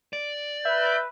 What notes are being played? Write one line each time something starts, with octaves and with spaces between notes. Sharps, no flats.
D5
B4 E5 G6